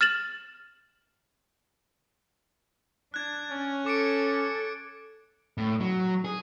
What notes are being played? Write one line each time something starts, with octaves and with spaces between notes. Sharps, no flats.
F6 A6 E7 F#7
D4 F#6 G#6
C#4
A4 D6 C#7 D7
A2
F#3
G#4